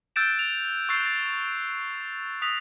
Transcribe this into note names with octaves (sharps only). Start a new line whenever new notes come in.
E6 F#6 G6 A6 D7 E7
F7
C#6 E6 F#6 G6 A6 C7
A6
D7
D#6 F#6 A#6 B6 F7